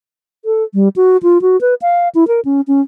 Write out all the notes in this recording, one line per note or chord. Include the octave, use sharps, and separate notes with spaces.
A4
G3
F#4
F4
F#4
B4
F5
E4
A#4
C#4
C#4